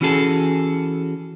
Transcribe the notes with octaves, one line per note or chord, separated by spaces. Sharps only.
E3 C#4 F#4 G#4 A4